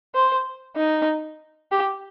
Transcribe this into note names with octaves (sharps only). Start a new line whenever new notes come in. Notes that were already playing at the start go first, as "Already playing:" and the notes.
C5
D#4
G4